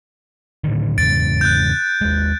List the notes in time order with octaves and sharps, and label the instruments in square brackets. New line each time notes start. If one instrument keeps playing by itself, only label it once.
[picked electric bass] A2 D3 D#3
[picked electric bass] E2 G#2 C#3 [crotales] A6 D7
[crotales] F#6 G6
[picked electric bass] D#2 G#3